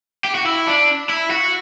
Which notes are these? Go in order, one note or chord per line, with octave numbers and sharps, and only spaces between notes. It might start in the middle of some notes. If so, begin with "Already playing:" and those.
G4
F#4
E4
D4
E4
F#4